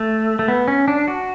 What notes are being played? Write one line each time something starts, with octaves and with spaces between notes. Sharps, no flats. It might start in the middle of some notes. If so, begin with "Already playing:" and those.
Already playing: A3
A3
B3
C#4
D4
F#4